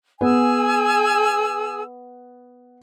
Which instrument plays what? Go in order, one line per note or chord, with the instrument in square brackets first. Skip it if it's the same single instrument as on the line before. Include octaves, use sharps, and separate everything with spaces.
[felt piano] B3 [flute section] G#4 G#5 E6